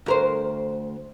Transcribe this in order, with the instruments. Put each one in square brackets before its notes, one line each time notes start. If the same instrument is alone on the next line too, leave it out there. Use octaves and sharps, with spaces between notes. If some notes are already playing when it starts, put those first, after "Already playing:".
[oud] D2 A#4 C5